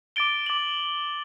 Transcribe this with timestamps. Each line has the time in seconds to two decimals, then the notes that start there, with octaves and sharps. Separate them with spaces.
0.16 D6 A6 D7 G7
0.46 D6 A6 D7 F#7